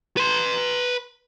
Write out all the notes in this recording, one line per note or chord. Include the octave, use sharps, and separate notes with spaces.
B4 C6